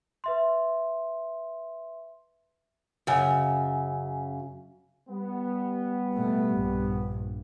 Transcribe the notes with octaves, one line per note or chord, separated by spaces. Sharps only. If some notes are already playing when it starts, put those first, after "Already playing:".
B4 E5 C6
F#2 C#3
G3 B3
B2 A3
A#1 G2